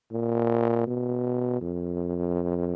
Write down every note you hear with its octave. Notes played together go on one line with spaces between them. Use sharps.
A#2
B2
F2